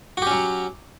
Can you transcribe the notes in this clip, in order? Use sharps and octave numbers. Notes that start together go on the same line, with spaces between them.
F#3 C#4 F#4 G4